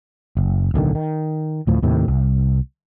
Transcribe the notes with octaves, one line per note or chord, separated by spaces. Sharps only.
F#1
D1 B1 D3 D#3
D#3
D2 A2 F3
D#2 A2 C3 D#3
C2